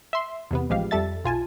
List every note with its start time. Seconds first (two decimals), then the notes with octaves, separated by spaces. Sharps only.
0.13 E5 C6
0.51 E2 C3 B3
0.70 A1 F3 G#3 G4 F5
0.91 F2 G3 A4 E5 A6
1.24 B1 F4 G#5 A5